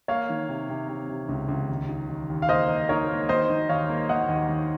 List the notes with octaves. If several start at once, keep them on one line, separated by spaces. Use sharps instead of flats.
A#3 C#5 F5
D#3
C3
C3
C3
C3
C#2
C#2
D#2
D#4
D#2
D#2
F5
A#3 C5 D#5
A#3
D#4 A#4 C#5
A#3
D#3 C5 D#5
D#3
D#2 C#5 F5
A#3
D#3 D#5 F#5
D#2
D#3